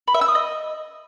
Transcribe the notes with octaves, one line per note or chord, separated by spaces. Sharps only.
B5
E5
E6
D#6
D#5